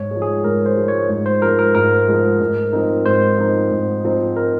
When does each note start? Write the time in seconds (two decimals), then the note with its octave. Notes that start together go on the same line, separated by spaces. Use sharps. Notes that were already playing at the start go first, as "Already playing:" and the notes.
Already playing: G#2 C#5
0.11 G#3
0.16 F3
0.22 G#4
0.44 G#2 A#4
0.66 C5
0.77 F3 G#3
0.88 C#5
1.09 G#2
1.26 C5
1.42 F3 G#3 A#4
1.59 A#4
1.75 G#2 A#4
2.08 F3 G#3
2.40 G#2
2.72 F3 C4 D#4
3.06 G#2 C5
3.38 F3 C4 D#4
3.71 G#2
4.04 F3 C4 D#4
4.36 A#4